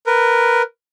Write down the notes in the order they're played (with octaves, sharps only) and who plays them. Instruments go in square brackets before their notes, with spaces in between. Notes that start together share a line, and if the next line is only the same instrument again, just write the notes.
[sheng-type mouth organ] A#4 B4